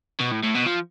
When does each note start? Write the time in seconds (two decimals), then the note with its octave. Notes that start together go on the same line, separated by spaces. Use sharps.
0.20 B2
0.32 A2
0.43 A2
0.55 B2
0.66 F3